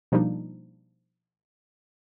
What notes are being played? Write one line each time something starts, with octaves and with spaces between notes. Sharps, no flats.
B2 F3 G3 A#3 D4 D#4